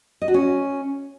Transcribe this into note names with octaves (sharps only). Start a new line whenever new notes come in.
D#5
F#4
C#4